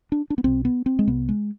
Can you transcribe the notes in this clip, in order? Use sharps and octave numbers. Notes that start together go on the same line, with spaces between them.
D4
D4
B3
B1 B2 C4
B3
C4
G#3
C2 C3 B3
G#3